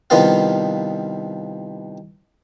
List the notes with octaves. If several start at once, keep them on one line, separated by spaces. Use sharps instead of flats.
C2 D#3 F3 B3 F4 F5